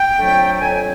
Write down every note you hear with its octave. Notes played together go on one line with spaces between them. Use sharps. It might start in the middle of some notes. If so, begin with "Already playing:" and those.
Already playing: G5
F2 D3 F#3 A3
F2 D3 F#3 G#5